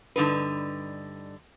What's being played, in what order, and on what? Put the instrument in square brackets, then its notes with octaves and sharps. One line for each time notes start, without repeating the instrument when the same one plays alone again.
[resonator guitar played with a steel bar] G2 D3 D#4 B4